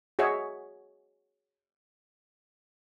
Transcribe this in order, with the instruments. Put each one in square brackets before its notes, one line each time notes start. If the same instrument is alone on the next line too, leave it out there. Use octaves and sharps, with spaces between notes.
[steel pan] F#4 G#4 C#5 D#5 E5